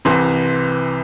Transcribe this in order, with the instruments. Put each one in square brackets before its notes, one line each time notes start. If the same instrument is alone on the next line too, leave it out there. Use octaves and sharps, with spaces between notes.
[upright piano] C2 C3 E3 C6